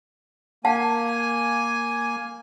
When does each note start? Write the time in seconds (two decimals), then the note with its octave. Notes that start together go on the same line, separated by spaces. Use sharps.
0.65 A#3 F5 F#5 G#5 A5